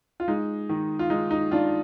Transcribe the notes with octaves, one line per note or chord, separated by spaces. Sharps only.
F4
G#3 D#4
D#3
F4
G#3 D#4
D#4
D#3 D4 F4